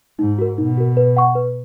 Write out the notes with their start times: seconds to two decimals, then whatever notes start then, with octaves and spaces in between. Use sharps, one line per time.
0.19 G#2 D#4
0.38 F#4 A#4
0.58 B2 D#4
0.78 F#4 A#4
0.97 B4
1.17 F#5 C#6
1.35 B4